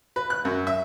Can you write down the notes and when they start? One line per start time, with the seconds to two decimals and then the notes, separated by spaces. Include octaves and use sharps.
0.16 B4
0.30 F#6
0.45 F#2
0.67 E5